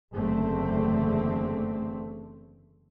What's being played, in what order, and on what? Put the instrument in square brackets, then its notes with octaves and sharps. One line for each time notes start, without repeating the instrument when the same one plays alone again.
[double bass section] F#1 E2 D3 A3 C4